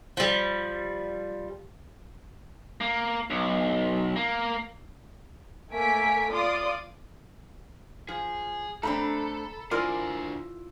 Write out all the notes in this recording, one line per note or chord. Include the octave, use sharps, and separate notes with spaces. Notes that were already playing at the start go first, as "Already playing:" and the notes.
F3 G3
A#3
B1
A#3
A3 A#3 A4 G#5 B6 D7
F4 D5 C6 D6 D#6
F3 G#4
A3 C4 D4 A4 A#5 B5
D3 E4 F4 A#4 C5 D5 G#5 D6